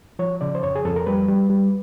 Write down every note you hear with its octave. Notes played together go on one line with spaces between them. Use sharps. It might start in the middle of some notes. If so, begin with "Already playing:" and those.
F3 C#5
C#3 D5
C5
F2 C#5
G#4
F2 A4
A#4
G3 B4
G3
G3